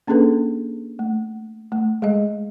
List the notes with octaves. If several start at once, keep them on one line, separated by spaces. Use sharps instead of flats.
A#3 C#4 D4 G#4 A4 B4
A3
A3
G#3 G#4 D#5